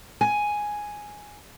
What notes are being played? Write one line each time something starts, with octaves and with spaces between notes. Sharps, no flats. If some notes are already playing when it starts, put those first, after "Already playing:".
G#5